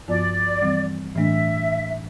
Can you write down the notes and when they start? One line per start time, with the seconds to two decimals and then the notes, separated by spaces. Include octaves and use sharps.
0.08 G2 F3 B3 F4 D5
0.62 E3 G3 C4
1.15 A2 E3 A3 D4 E5